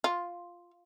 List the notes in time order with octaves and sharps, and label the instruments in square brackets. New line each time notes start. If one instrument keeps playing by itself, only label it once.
[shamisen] F4